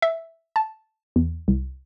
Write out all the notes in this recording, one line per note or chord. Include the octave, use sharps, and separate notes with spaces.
E5
A5
E2
C2